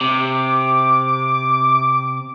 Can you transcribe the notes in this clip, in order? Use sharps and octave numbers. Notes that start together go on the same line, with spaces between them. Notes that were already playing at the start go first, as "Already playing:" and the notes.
C3 D6